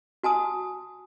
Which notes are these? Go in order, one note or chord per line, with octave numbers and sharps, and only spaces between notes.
F#4 G#5 A5 D#6